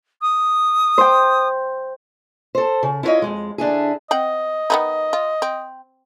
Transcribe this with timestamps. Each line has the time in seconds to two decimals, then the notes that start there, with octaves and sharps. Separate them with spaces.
0.22 D#6
0.98 C5 G5
2.55 A4 C5
2.83 C#3
3.03 E4 F4 B4 C#5 D#5
3.22 F2 G#2 G#3
3.58 D3 D4 E4 G#4
4.11 C4 D#5 F#5 G5
4.70 D#3 B3 D#4
5.13 F4
5.42 C4